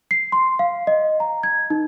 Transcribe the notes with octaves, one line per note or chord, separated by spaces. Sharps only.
C7
C6
F5
D#5
A#5
G#6
D#4